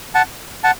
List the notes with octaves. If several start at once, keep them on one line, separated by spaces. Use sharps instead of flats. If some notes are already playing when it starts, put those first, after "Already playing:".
F#5 A5
F#5 A5